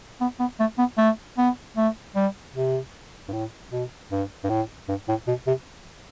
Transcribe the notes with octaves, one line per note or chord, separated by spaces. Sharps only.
B3
B3
A3
B3
A3
B3
A3
G3
C3
G2
A2
B2
G2
G2
A2
G2
A2
B2
C3